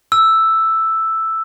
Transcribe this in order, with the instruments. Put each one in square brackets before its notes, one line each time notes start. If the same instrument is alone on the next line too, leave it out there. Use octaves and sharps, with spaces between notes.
[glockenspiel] E6